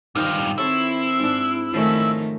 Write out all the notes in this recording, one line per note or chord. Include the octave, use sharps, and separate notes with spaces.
G2 D#3 F4 C5 D#5
C4 E4 A4 C#5
G#2 D4
D#3 F3 A3 C#4 E5